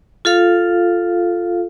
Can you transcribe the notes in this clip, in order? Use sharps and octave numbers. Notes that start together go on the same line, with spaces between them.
F4 A4 F5